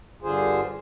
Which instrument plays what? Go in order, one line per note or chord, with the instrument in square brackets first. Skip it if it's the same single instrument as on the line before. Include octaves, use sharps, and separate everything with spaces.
[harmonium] G2 D3 F4 G#4 C5